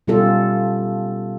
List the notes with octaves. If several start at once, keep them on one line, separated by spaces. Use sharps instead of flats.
B2 G3 C#4 F4 G4 A4